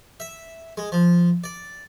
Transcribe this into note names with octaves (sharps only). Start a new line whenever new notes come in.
E5
G#3
F3
D5